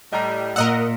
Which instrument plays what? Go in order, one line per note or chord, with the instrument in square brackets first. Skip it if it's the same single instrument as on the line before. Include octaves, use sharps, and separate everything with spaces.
[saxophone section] A2 G3 [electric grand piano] D#5 A#5
[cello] A#2 [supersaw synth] A#4 D#5 F#5 [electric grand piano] E6